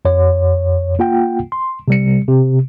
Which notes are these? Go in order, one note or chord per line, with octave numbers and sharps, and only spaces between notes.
F2 C#5
A#3 F4 F#5 G5
C6
C3 G3 C#7
C3